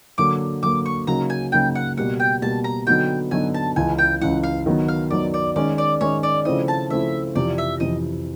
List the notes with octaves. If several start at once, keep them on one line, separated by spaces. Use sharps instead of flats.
D3 F#3 A#3 D6
D3 F#3 A#3 D6
C#6
C#3 F#3 A#3 D#4 A#5
G#5
C#3 F#3 A#3 D#4 G5
F#5
B2 G3 A#3 F#5
G5
B2 G3 A#3 A5
A#5
D3 F#3 B3 D#4 F#4 G5
D3 F#3 B3 D#4 F#4 G#5
A5
C#2 C#3 E3 G#5
G5
C#2 C#3 E3 F#5
F5
D#3 F#3 B3
F5
D#3 F#3 B3 D5
D5
D#3 G#3 C#4 D5
D5
D#3 G#3 C#4 C#5
D5
C#3 F3 A3 C4 E4 D#5
A5
C#3 F3 A3 C4 E4 E5
F2 C3 E3 D5
E5
F2 C3 E3 D#5